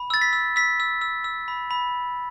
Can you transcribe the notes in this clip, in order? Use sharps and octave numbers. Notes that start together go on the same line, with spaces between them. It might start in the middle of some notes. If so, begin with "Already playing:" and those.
Already playing: B5
E6 A6
B6
E6
E6 B6
E6
E6
E6
B5
B5